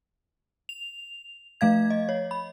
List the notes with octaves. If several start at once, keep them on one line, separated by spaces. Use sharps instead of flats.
F7
F3 A3 F5 G#6
D#5
C#5
B5